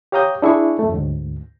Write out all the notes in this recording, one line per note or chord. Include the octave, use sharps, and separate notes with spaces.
G4 C#5 F5 A#5 D#6 G6
D4 E4 G#4 C#6
F2 A3
D2 G#2